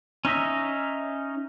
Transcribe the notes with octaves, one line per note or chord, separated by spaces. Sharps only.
C#4 D#4 D#5 E5